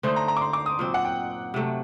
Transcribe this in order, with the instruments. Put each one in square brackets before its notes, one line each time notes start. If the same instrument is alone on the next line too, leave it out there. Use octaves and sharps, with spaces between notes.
[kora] D3 A3 D#4 [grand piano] C5
[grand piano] A#5
A#5
D6
C6
D6
D#6
[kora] A#2 F#3 C4
[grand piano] F#5
G5
[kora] C3 F#3 A3